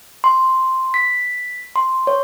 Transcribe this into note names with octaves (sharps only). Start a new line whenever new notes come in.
C6
B6
C6
C#5